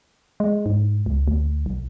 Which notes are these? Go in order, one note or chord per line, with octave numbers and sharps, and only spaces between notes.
G#3
G#2
C#2
D2
B1